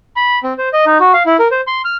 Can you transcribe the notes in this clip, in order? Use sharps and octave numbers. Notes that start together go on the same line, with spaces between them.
B5
C4
C5
D#5
D#4
F#4
F5
E4
A#4
C5
C6
F6